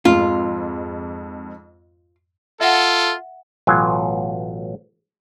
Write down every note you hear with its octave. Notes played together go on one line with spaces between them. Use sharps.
F2 G#2 F4
F4 A4 E5 F#5
A1 B2 F#3 F4 G#5